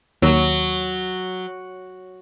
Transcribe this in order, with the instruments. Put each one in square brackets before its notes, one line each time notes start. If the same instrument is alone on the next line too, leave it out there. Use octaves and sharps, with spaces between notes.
[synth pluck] D#2 [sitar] F#3